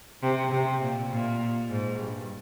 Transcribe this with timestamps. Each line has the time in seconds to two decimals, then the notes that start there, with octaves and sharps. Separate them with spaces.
0.22 C3
0.52 C3
0.81 A#2
1.10 A#2
1.69 G#2
1.99 G2